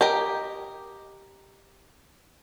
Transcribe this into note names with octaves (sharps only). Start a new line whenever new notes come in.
G4 A#4 D#5